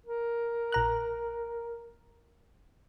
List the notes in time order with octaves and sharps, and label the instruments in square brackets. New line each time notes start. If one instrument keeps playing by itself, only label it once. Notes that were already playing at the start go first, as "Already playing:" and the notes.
[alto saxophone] A#4
[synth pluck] A#1 A#5 F#6